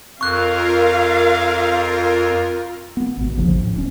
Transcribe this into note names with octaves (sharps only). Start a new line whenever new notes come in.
F2 F4 A#4 F5 C#6 F#6
B3
G#1 B2
A1 D#2 C#3 F3
A2
D1 C#4